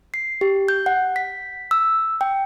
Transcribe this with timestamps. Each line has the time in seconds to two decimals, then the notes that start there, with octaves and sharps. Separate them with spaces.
0.14 C7
0.41 G4
0.68 G6
0.86 F#5
1.16 B6
1.71 E6
2.21 G5